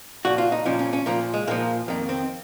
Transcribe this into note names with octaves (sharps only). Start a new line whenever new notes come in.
A#2 F3 F#4
F4
D#4
A#2 F3 C#4
C#4
C#4
A#2 F3 A#3
G#3
A#2 F3 A#3
F2 D#3 A#3
C4